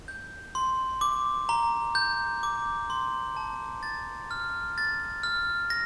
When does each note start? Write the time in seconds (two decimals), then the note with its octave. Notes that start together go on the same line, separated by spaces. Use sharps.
0.08 G6
0.55 C6
1.01 D6
1.49 A#5
1.95 G6
2.43 D6
2.90 C6
3.37 A5
3.83 A6
4.31 F6
4.78 A6
5.23 F6
5.70 A#6